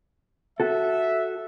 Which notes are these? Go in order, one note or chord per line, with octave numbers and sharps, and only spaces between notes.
F#4 A4 E5